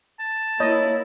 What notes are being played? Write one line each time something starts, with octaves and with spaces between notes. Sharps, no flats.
A5
A#3 E4 C#5 D#5